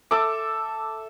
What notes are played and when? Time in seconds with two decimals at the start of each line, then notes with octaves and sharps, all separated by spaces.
0.11 A4 E5 D6